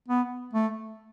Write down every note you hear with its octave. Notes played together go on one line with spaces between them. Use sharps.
B3
A3